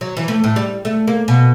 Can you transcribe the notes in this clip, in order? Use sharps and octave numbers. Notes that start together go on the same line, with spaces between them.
F#3
E3
A3
A2
G3
A3
A#3
B2